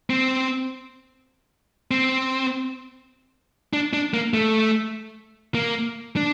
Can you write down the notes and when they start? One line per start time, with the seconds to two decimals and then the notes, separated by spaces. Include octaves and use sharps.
0.10 C4
1.91 C4
3.73 D4
3.93 D4
4.14 A#3
4.34 A3
5.55 A#3
6.16 D4